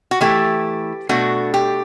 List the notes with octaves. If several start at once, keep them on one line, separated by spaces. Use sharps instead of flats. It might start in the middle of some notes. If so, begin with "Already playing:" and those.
F#4
E3 A3 E4 G4
B2 A3 D4 F#4
G4